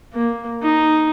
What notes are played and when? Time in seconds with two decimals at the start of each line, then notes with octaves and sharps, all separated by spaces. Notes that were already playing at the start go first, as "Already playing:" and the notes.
0.13 A#3
0.63 D#4